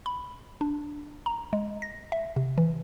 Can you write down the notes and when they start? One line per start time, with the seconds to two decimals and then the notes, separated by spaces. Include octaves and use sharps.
0.06 B5
0.61 D4
1.26 A#5
1.53 G#3
1.82 A#6
2.12 E5
2.36 C3
2.58 E3